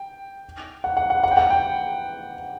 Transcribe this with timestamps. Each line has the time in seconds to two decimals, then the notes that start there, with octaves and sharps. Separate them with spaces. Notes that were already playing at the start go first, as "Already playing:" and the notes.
Already playing: G5
0.84 F#5
0.97 F#5
1.10 F#5
1.23 F#5
1.31 G5
1.37 F#5
1.50 G5